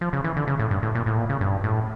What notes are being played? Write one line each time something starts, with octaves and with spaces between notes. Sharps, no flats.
F3
C#3
E3
D3
C#3
A2
G2
A2
A#2
A2
A#2
C#3
G2
A2